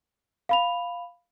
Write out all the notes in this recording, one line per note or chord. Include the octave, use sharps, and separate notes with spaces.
F5 B5 F7